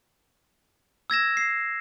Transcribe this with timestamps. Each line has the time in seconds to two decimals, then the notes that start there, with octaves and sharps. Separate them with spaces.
1.10 E6 G#6 A#6 E7
1.37 C7